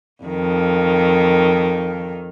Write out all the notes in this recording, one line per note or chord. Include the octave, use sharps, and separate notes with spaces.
F2 D#3